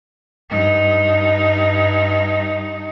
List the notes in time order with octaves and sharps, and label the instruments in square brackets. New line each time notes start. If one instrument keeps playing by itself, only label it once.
[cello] G2 D#4